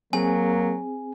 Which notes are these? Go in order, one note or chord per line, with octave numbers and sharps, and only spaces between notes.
F#3 A#3 C4 G#4 G#5